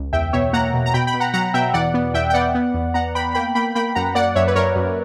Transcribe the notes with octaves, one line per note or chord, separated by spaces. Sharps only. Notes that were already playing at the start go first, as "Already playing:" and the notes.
Already playing: C#2
E2 E5 G5
B2 C#5 E5
A#3 F#5 A#5
B2
A#5
B2 G5 B5
G5 B5
B2
F#5 A#5
F#3 F#5 A#5
B2 E5 G5
E2 D5 F#5
B3
E2 E5 G5
G5
B3 D5 F#5
B3
E2
B3 F#5 A#5
B3 G5 B5
A#3 G5 B5
A#3 G5 B5
A#3 G5 B5
F#2 F#5 A#5
A#3 D5 F#5
F#2 C#5 E5
B4
F#2 A#4 C#5
F#2